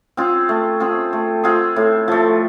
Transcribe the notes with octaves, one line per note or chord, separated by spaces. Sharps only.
C4 F4 G#4
A3
C4 F4 G#4
A3
C4 F4 G#4
A2
F3 A3